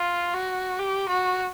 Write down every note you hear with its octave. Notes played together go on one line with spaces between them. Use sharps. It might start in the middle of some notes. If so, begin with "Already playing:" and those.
Already playing: F4
F#4
G4
F#4